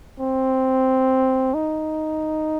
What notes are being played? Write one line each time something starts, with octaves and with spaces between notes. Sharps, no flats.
C4
D#4